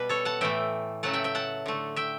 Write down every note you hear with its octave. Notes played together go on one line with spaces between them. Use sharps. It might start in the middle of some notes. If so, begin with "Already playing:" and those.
Already playing: B2 G3 B4
A4 C#5
F#5 A5
A2 E3 A3 E5 G5
C#3 F#3 A3 F#5 A5
E5 G5
E5 G5
F#5 A5
D3 A3
E5 G5